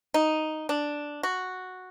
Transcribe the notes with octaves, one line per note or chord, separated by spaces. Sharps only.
D#4
D4
F#4